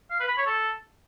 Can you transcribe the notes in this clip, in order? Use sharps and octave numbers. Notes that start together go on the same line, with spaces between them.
F5
B4
B5
C#5
A4